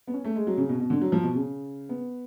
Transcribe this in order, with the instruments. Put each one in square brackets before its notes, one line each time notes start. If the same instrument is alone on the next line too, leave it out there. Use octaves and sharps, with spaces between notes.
[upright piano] B3
C#4
A3
G#3
F#3
C#3
B2
B2
D3
F#3
F3
B2
C#3
B3